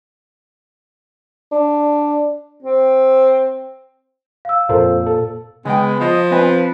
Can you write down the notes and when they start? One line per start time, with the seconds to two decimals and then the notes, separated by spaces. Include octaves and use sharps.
1.52 D4
2.63 C4
4.45 F5 E6
4.69 F2 A#2 A4 C5
5.07 A4
5.65 C#3 G#3 B3 G5
6.00 F3 D#5
6.31 C4 B4 D#5 G#5